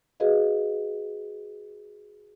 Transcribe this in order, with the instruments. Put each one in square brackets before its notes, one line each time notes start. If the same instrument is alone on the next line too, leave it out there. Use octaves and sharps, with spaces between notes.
[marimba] F#4 G#4 B4 D#5 F5